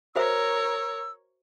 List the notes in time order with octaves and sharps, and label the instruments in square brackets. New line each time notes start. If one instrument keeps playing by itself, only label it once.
[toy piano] F#4 C5 E5 [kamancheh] A#4 C#5 [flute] E6